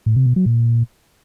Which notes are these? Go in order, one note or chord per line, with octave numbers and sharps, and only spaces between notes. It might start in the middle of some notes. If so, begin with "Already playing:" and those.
A2
C3
B2
F#3
A#2